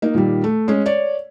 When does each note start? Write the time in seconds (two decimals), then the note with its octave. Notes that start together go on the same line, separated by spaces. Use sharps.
0.02 A#3 D#4
0.15 A#2 D#3 G3
0.44 A3
0.68 G#3 C#4
0.86 C#5 D5